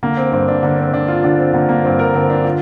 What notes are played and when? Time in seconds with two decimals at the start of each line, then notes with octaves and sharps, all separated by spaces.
0.03 D3 A#3
0.17 C4
0.32 G2 C4
0.48 D4
0.63 D3 A#3
0.78 C4
0.93 D3 D4
1.08 F4
1.24 D3 D4
1.38 C4
1.53 D3 A#3
1.69 A#3
1.84 G2 C4
1.99 A#4
2.14 D3 C4
2.30 D4
2.45 F4